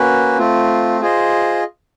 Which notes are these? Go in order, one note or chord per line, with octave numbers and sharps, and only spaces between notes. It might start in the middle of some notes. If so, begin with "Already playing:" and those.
Already playing: A#3 C#4 F#4 B4
A3 C4 F4
F4 G#4 C5 D#5